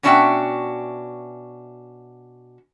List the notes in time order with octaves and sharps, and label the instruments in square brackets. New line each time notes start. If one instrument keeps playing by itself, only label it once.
[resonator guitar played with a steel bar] B2 C#4 D4 F#4 E5 G5